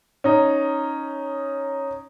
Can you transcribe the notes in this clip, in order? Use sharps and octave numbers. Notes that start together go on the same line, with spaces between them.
C#4 D#4